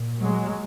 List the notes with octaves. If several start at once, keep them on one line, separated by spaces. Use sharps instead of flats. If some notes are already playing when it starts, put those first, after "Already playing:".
Already playing: A#2
F#3 G#3